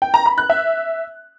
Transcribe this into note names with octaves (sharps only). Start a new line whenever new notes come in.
G5
A#5
B5
F#6
E5